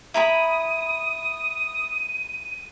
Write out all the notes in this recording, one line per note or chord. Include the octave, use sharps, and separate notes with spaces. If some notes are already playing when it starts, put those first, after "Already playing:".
E4 A#5 B5 D#6 D#7